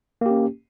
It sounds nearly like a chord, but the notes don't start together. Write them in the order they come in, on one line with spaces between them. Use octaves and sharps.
A#3 G4 C#4